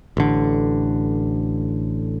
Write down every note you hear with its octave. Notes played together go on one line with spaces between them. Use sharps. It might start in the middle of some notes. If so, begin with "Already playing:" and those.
A1 D3